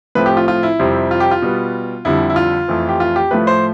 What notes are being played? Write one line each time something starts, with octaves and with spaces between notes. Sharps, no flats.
A2 F3 A3 C4 B4
G4
F4
F4
E4
F2 C3 G3 C4
F4
G4
F4
B2 G3 B3
F2 D3 G3 E4
E4
F4
F2 E3 A3 C4
G4
F4
G4
A2 F3 A3 B4
C5